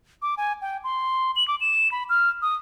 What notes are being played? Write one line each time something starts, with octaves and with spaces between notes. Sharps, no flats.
D6
G#5
G5
C6
F#7
D6
E7
B5
F6
D#6